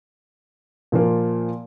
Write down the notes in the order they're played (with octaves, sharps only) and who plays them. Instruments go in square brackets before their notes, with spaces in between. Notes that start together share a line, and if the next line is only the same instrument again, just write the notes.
[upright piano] A#2 F3 A#3